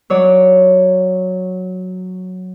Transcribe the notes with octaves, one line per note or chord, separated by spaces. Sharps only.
F#3 C#5 D5